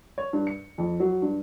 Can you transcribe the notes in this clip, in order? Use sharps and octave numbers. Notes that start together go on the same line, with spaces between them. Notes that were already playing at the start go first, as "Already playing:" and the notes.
C#5
G2
C#7
F2
F#3
G2